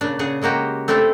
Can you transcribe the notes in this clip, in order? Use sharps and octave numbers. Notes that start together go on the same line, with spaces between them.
A#2 C#3 D4
C#3 D4 G#4 F#5
C#3 G#3 A#3 F#4 G4
A3 C4 D4 E4 G4 A4